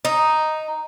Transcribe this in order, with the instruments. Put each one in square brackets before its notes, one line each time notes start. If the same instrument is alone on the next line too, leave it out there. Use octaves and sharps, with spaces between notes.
[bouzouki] D#4